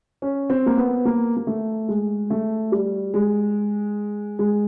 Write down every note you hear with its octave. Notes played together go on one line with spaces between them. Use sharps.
C#4
C4
A#3
B3
A#3
A#3
A3
G#3
A3
G3
G#3
G#3